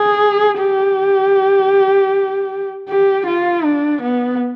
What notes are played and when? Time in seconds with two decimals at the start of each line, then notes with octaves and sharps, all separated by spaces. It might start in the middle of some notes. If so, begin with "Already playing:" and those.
Already playing: G#4
0.59 G4
2.88 G4
3.27 F4
3.64 D4
4.02 B3